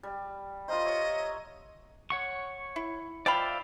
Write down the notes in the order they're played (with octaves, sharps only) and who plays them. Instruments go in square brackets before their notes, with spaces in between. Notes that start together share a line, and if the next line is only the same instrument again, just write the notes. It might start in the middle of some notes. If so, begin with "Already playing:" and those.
[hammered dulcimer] G3
[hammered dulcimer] F4 A#4 C5 [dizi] D#5
[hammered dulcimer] C#5 E5
[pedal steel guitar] C#5 F#5 C#6
[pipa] E4
[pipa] F3 G5 B5 [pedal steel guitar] D5 E5 F5